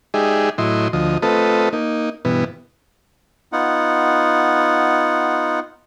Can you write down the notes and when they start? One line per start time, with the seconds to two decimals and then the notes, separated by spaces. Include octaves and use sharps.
0.14 G#3 D#4 G4 G#4 D5 E5
0.58 A2 F#3 E4 D#5 C6
0.93 D2 F3 D#5
1.22 A3 C4 F4 A4 B4 D#5
1.73 A#3 D#4
2.25 G2 B2 E3 B3
3.52 B3 D#4 F4 F#5